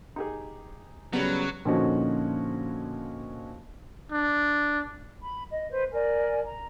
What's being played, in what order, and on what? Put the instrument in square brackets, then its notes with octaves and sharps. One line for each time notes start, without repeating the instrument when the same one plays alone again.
[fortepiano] D#4 G4 G#4
[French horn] C#3 [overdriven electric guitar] F#3 [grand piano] G3 B3
[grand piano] A#2 D3 F3 C#4 D#4 F#4
[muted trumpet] D4
[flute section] B5
D#5
B4 C5
A#4 D5 G#5
A#5